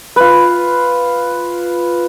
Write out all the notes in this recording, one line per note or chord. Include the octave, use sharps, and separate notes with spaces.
F4 B4